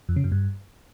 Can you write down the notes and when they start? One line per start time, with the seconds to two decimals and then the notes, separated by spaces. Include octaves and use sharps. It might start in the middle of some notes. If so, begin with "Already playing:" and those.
0.09 F2
0.16 C#3
0.24 F#2
0.32 G2